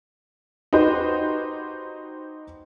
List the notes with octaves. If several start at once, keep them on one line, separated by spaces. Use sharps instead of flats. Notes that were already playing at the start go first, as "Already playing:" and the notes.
D#4 F#4 G4 B4 C5 D#5